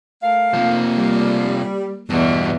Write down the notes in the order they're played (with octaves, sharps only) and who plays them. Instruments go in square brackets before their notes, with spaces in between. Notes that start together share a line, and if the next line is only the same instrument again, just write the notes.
[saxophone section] A3 A#4 F5
[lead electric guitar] C3 F3 [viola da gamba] A#3
[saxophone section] G3
[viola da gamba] E2 [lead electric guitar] G2 B2